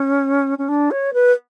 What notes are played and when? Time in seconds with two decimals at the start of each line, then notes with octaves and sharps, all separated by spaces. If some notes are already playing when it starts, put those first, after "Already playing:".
Already playing: C#4
0.58 C#4
0.68 D4
0.91 C#5
1.13 B4